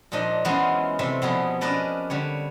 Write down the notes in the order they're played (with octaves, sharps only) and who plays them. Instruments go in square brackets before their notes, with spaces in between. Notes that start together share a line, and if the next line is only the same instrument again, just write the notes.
[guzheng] A#2 F3 D4 D#4 D#5
E3 F#3 G#3 B3 C#4 F4
C3 G3 A3 E5
B2 F3 B3 E4 G4 G#4
C#4 D4 A#4 B4 D5 D#5
D3 G3 C#5